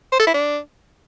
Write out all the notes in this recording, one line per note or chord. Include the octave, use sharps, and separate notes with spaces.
C5
A4
E4
D4